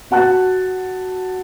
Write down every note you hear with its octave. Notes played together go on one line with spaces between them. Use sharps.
F#4 F#5 A5 F#6